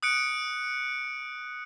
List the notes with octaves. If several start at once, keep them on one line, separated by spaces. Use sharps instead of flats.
D#6 F#6 C#7 D7